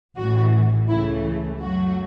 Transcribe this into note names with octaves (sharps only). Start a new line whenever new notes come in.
A1 A2 E3 F#4
C#2 C#3 E3 A3 E4
F#2 F#3 A3 F#4